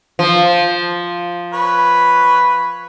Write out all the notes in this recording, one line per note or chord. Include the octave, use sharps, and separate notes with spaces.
F3
B4 C#5